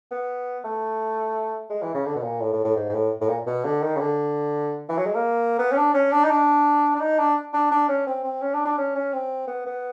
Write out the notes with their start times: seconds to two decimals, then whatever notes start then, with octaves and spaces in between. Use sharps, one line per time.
0.11 B3
0.64 A3
1.70 G#3
1.82 E3
1.94 C#3
2.06 D3
2.16 B2
2.23 A#2
2.41 A2
2.53 A2
2.64 A2
2.76 G#2
2.90 G#2
2.94 A2
3.21 A2
3.29 A#2
3.47 B2
3.65 D3
3.82 D#3
3.96 C#3
4.00 D3
4.89 E3
4.97 F#3
5.06 G#3
5.15 A#3
5.59 B3
5.72 C#4
5.77 D4
5.94 C#4
6.12 D4
6.24 D#4
6.30 D4
6.96 D4
7.01 D#4
7.19 D4
7.54 D4
7.71 D4
7.89 C#4
8.07 C4
8.24 C4
8.42 C#4
8.54 D4
8.65 D4
8.78 C#4
8.95 C#4
9.13 C4
9.48 B3
9.66 B3